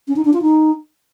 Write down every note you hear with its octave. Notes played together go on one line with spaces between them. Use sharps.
C#4
D#4
D4
F4
D#4